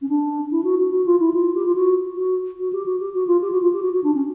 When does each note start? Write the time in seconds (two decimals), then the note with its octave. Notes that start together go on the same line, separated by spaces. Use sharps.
0.02 C#4
0.09 D4
0.51 E4
0.64 F#4
0.79 F#4
0.92 F#4
1.06 F4
1.20 E4
1.34 F4
1.55 G4
1.66 F4
1.75 F#4
2.17 F#4
2.59 F#4
2.73 G4
2.86 F#4
3.00 G4
3.14 F#4
3.27 F4
3.41 G4
3.52 F#4
3.62 F4
3.73 G4
3.82 F#4
3.93 F#4
4.04 D4
4.14 C#4